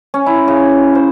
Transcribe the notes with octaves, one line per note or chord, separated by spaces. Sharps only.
C#4
E4
C#3
C5